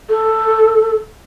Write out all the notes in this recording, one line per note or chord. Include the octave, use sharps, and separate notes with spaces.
A4